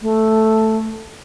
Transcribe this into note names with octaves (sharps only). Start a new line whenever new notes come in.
A3